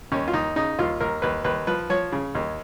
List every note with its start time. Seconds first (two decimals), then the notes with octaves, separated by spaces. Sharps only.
0.12 D#2 C#4
0.28 F4
0.33 D#2 D#4
0.56 C#3 D#4
0.79 D#2 F4
1.01 D#2 A#4
1.22 D#2 B4
1.44 D#2 B4
1.67 F3 B4
1.90 F3 C#5
2.12 C#3
2.35 D#2